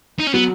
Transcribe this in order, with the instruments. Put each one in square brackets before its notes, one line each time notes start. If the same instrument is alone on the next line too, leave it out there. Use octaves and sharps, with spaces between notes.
[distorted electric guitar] D#4
C#4
[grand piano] F#3 [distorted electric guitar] B3